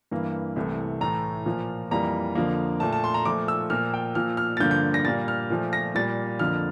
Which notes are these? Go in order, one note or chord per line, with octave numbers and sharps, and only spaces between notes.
G2 E3 A#3
C2 C3 E3 A3
A2 E3 A3 A#5
A#2 F3 A#3
F2 E3 G3 A#3 A#5
F2 D3 F3 A#3
A#2 A3 A5
A5
C6
A#5
A#2 F3 A3 D6
E6
A#2 F3 A#3 F6
G5
A#2 F3 A#3 F6
F6
A6
G2 D3 F3 A#3 G6
G6
A#6
A#2 G3 A#3 A6
F6
A#2 F3 A3
A#6
A#2 G3 A#3 A6
F2 D3 F3 A#3 F6